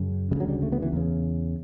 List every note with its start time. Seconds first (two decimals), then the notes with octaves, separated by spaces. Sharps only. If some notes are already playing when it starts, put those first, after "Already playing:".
Already playing: F#2 C#3
0.31 C#3 G3
0.35 D2
0.40 F#3
0.49 G3
0.63 A3
0.72 B3
0.82 E3
0.93 E2 C#3